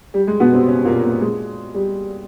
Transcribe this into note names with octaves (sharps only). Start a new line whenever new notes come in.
G3
G#3
B2 B3
C3 C4
C#3 C#4
A#2 A#3
A#2 A#3
G#3
G3